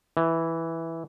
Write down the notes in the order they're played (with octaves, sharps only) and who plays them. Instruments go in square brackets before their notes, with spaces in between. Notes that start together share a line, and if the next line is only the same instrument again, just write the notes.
[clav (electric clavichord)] E3